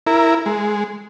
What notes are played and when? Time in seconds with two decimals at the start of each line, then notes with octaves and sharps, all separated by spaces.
0.07 E4 A#4
0.46 G#3